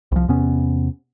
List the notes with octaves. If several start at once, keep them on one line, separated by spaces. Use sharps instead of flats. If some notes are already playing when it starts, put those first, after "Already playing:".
C2 F3
E2 C3 B3 C#4